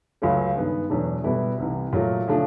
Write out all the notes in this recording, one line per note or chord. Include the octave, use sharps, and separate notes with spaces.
C#2 C#3 F#3 A3 C#4
G2 D#3 G#3 B3
E2 B2 F#3 A3 D4
B2 G3 B3 E4 A4
C2 C3 E3
A#2 F#3 A3
C#3 F3 A3 D4